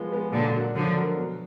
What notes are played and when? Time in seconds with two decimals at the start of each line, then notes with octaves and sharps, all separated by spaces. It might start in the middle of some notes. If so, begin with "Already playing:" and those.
Already playing: F3 G#3 B3
0.12 G#3 B3
0.32 A#2 D3 F#3
0.54 D4 F#4 A#4
0.75 D3 F3 F#3
0.96 D4 F#4 A#4
1.16 B2